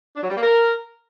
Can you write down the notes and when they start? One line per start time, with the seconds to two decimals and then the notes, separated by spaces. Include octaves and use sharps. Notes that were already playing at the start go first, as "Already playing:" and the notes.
0.17 D4
0.23 F#3
0.30 G3
0.36 A#3
0.43 A#4